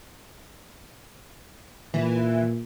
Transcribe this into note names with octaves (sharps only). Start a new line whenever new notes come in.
A#2 E3